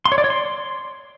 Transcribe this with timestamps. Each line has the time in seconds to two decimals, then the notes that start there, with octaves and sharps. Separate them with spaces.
0.06 C6
0.12 C#5
0.18 D5
0.24 C#5
0.30 C6